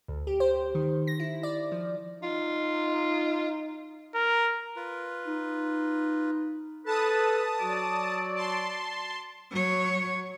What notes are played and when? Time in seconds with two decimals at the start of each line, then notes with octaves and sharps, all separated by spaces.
0.08 D2
0.27 G4
0.40 C5
0.75 D#3
1.07 A#6
1.20 E4
1.43 D5
1.72 F3
2.23 D#4 F4
4.15 A#4
4.76 F4 B4
5.26 D#4
6.86 A4 B4 A5 D#6
7.59 F#3 F#4 D5
8.36 A5 C6
9.51 F#3 C#5